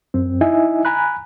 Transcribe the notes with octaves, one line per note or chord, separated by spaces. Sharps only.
F#2 C4
D#4 E4 D#5 E5 G#5
G#5 A#5 B5 F#6